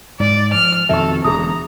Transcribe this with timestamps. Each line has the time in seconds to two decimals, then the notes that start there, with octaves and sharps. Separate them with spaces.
0.20 G#2 D5
0.54 F3 F6
0.89 F2 B2 D#3 A4 E5 C#6
1.24 E1 D2 G#4 A#5 D#6